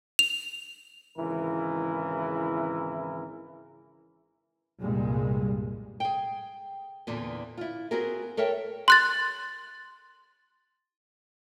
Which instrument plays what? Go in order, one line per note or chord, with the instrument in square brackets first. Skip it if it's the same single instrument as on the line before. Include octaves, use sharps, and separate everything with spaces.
[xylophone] F7
[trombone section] G#1 C#3 E3 E4 A#4
[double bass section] C2 G2 A#2 G3 G#3
[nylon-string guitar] G#4 G5
E2 A#2 D3 E3 B3
E4 F4
B3 C4 F4 F#4 G#4 A#4
A4 A#4 C#5 E5 G5
[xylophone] C6 F#6 A6